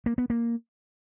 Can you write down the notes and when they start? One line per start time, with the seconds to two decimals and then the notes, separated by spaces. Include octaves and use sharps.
0.06 A#3
0.18 B3
0.30 A#3